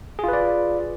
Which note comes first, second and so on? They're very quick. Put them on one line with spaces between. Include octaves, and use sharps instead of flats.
G#4 F4 B4 D5